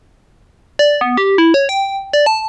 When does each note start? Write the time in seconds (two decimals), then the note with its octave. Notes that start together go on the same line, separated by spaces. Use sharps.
0.79 D5
1.01 B3
1.17 G4
1.38 E4
1.54 C#5
1.69 G5
2.13 D5
2.26 A5